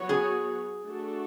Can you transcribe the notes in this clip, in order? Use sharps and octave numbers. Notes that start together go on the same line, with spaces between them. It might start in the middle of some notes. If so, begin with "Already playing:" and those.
Already playing: F#3 B3 F#4 C#5
G#4
A3 D4 F#4 A4